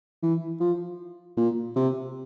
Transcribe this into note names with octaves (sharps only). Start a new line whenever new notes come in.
E3
F3
A#2
C3